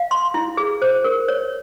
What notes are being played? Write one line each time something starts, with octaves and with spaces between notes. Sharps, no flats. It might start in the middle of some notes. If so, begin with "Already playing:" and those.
Already playing: F5
C6
E4
G#4
C5
A#4
C#5